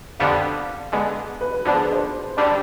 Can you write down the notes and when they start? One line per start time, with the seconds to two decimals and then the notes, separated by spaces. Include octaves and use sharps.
0.20 F2 D3 G3 B3 F5
0.92 D3 G#3 B3
1.41 B4
1.53 B4
1.65 D3 F3 B3 D4
1.74 G#4
1.83 B4
1.93 C5
2.37 D3 G3 D4 D5